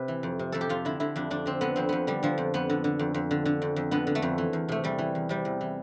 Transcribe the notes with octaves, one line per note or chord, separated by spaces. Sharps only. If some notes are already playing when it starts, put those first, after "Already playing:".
Already playing: C3 B4
E3
F2
C3
F2 A4
G4
F2 F4
D3 E4
D3 E4
F2 D4
F2 D4
D3 C4
D3 B3
F2 C4
F2 B3
D3 G3
D3 F3
F2
F2 B3
D3
D3
F2
F2
D3
D3
F2
F2
D3 B3
D3
A3
F2
E3
E2
C3 A3
E2 G3
E3
E2
C3 G3
E2
E3